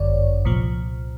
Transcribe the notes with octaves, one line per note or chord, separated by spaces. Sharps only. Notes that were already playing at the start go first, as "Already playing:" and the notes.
Already playing: G1 F#2 D3 C#5 D5
C2 A#2 F3